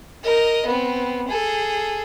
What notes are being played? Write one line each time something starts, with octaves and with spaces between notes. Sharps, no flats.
A#4 D#5
B3 C4
G#4 A4